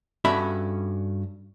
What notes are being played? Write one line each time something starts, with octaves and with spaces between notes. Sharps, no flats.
G2 C#4 F#4 A4 E5 B5